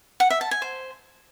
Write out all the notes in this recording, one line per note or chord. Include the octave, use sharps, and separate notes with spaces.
F#5
E5
A5
G#5
C5